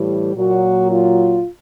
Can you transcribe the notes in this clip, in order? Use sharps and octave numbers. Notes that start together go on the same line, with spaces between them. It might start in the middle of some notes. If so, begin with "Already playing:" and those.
Already playing: A2 E3 G3 G4
A#2 F#3 F#4
F4